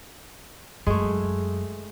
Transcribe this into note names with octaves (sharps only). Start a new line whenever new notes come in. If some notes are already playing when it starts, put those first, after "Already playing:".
F#2 G#3 A3